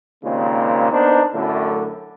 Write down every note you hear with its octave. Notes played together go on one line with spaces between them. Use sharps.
D#2 A#2 C#3 G#3 A#3 C4
B3 D4 D#4 A#4 C5
F#2 A2 D3